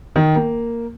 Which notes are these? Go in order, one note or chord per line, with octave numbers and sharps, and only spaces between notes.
D#3
A#3